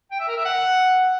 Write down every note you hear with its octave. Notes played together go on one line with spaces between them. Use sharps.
G5
E5
A#4
E5
F#5